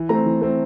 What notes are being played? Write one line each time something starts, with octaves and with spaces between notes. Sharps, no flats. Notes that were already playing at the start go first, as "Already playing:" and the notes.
Already playing: E3
A3 C4 A#5
E3
A3 C4